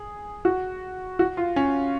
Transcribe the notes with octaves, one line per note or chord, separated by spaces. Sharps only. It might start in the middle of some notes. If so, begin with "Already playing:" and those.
Already playing: G#4
F#4
F#4
F4
C#4